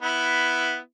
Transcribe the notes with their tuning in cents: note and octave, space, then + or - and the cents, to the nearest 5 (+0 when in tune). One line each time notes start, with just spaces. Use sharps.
B3 +0 E4 +0